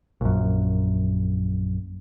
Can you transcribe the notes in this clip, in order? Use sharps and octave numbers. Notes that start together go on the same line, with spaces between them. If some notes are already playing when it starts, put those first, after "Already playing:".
A#1 F#2